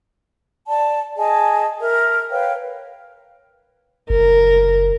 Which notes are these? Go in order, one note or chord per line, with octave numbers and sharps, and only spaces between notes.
D5 A5
G#4 D#5 G#5 A5
A#4 E5
B4 C#5 F5 G5
F#1 A#4